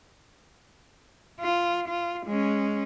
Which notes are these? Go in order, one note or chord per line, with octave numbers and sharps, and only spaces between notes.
F4
F4
G#3 C#4